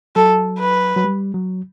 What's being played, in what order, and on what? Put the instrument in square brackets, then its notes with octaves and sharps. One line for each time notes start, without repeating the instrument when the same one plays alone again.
[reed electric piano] F#3 [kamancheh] A4
[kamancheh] B4
[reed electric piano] F#3
G3
F#3